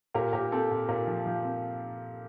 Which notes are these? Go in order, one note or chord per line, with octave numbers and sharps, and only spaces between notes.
A#2 G4 A#4
A#2 G4 A#4
C4 A4
A#2
A#2 G4 A#4
F3
F3
C4